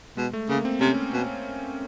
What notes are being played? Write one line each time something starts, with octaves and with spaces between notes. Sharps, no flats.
B2 G#3
A3
C#3 A#3
C4
C3 C#4
B2